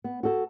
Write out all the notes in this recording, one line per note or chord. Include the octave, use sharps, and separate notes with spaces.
B3
F#4 A4